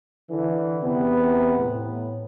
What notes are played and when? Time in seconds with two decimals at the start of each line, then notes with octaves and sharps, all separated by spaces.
0.29 D3 E3
0.83 E2 C3 B3
1.57 A2